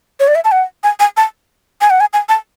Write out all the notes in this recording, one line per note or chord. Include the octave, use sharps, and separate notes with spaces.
C#5
D5
E5
A5
F#5
G#5
G#5
A5
G#5
F#5
G#5
G#5
A5